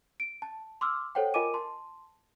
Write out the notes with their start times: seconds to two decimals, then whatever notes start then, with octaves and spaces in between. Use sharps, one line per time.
0.20 D7
0.42 A5
0.81 C6 D6 E6 F6
1.15 A4 C5 C#5 F#5 G5
1.34 F4 A#4 D#5 G#5 D6 D#7
1.54 A5 C6